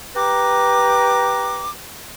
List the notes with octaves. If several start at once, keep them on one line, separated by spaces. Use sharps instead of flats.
G4 B4 A#5 D6